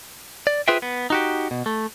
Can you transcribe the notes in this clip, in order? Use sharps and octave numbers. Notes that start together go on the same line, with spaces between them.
D5
F4 G#4 B4 C5 E5 G5
B3
D#4 F#4 G4
B2
A3